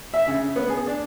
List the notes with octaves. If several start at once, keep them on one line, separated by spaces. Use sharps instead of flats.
E5
C#3
B3
G#4
D4